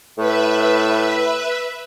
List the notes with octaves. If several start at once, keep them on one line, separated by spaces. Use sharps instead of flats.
A2 B4 E5